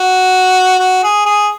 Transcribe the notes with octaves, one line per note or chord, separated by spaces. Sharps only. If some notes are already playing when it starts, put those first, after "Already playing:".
Already playing: F#4
F#4
G#4
G#4